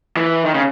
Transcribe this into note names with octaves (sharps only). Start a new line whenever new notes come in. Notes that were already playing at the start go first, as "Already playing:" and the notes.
E3
D#3
C#3